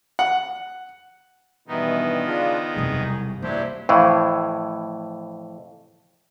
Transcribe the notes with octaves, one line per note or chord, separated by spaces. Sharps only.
F#5
G2 B2 D#3 E3 B3 D#4
C#3 D4 F4
E1 C2 F#2 G#4
G2 F#3 A#3 D4 E4 G4 C5
F2 A2 E3